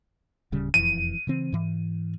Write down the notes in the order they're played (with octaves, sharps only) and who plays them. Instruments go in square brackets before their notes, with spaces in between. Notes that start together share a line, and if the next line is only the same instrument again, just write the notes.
[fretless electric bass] D1 C#3 G3
[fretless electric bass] E1 F2 E3 [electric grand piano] D#7
[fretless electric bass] C#3 E3 C4
G#2 E3